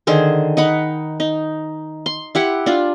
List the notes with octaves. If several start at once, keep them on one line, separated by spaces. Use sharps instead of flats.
D3 D#3 G#4 C5
D#4 F#5 B5
D#4
C6
E4 G4 F#5
D4 F4